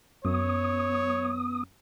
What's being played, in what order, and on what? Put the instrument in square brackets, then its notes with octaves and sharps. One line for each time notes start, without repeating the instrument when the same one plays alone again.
[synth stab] F#2 [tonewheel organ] B3 D#6 [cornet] C#5